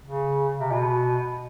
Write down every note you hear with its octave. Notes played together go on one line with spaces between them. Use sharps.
C#3
C3
B2